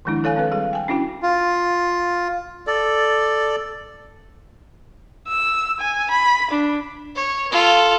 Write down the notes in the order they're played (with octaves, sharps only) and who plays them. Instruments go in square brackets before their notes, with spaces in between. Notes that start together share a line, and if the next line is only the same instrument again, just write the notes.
[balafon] D#3 F3 G#3 D4 E4
A4 C#5 F5 G#5
C4 A4 B4
G3 G#4 F5
G5 G#5
C#4 D4 E4 F#4 G5
[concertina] F4
[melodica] A4 D5
[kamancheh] E6
G#5
B5
D4
[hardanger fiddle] C#5
F4 A4